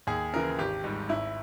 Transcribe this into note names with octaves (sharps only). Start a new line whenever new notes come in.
D#2 G#4
C#3 E3 A#4
G#1 G4
G#2 G3
G#1 E4